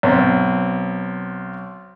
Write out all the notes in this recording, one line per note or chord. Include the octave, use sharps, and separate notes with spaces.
B1 C4